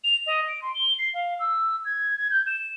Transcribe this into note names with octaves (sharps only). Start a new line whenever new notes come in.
F7
D#5
D7
C6
G7
C7
F5
E6
G#6
G#6
G6
E7